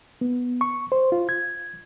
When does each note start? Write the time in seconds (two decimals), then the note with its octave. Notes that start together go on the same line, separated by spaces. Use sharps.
0.21 B3
0.61 C#6
0.92 C5
1.12 F4
1.29 G#6